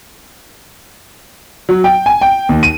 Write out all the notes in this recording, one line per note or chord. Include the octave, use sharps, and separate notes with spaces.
F#3
G5
G#5
G5
D#2
D#7